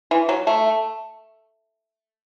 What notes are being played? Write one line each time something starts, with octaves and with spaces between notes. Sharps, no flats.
E3
F#3
A3